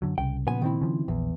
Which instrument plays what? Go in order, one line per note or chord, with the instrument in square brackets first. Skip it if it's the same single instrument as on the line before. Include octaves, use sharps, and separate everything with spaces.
[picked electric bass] F#2 D3 F#3
[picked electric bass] C2 C#3 [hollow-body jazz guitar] G5
[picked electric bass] A#2 C#3 F3 [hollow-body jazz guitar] B3 G#5
[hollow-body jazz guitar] D#3 C4 E4
[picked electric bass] C#3 F3
[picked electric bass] A#1 [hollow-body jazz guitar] E2